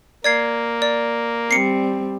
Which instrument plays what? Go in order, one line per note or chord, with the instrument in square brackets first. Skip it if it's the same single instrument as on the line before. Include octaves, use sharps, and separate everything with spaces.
[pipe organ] A#3 [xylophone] D5 G#6 C7
[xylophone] D5
[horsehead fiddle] G3 C4 [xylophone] C7 C#7